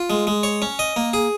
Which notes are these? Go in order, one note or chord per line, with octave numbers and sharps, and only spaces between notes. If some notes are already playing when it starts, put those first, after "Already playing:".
Already playing: F4
G#3
G#3
C#5
C#4
D#5
A#3
G#4